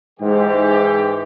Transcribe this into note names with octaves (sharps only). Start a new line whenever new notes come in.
G#2 E3 G4